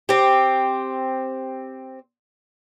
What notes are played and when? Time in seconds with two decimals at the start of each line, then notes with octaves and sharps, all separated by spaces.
0.09 C4 G4